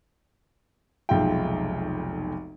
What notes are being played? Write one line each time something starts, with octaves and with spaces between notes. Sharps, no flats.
F1 B1 G#3 F4 E5 G5